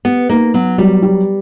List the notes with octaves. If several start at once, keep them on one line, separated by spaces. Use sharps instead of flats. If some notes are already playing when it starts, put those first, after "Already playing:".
B3 G4
A#3 D#4
F#3 B3
F#3 G3
G4